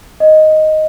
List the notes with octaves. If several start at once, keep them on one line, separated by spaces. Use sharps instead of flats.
D#5